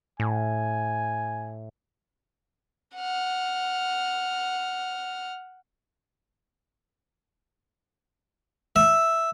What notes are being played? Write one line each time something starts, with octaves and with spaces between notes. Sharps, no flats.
A2 G#5
F#5 F6
E5